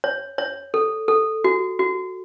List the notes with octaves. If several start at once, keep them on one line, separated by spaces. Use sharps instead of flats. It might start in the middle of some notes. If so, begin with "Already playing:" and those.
C#5
C#5
A4
A4
F#4
F#4